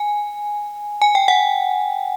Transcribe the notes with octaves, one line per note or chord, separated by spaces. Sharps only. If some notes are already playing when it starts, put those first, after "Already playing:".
Already playing: G#5
G#5
G5
F#5